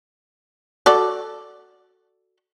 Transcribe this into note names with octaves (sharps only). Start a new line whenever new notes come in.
F#4 A4 D5